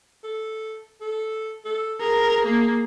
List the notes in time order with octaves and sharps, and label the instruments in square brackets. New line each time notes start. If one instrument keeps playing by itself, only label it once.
[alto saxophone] A4
A4
A4
[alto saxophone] G#4 [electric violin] A#4
[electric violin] A#3